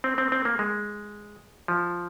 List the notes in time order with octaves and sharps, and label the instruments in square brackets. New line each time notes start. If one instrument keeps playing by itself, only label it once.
[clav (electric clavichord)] C4
C4
C4
A#3
G#3
F3